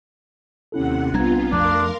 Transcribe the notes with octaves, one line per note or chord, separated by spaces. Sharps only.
D#2 C3 C#4 E4 A4 F#5
B1 G3 B3 C4 D4 F4 A#5 G#6
F2 F3 A3 D4 A#4 F5 C6